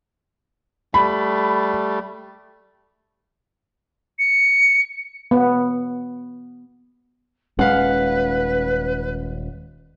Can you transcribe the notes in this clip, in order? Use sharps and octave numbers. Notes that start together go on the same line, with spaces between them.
G3 A3 B5
C#7
B3
D#1 G#3 C#4 B4 F5 F#5